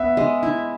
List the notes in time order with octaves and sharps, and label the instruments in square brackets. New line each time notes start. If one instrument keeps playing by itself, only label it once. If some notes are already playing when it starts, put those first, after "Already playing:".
Already playing: [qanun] B3 [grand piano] E5
[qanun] G#3
E4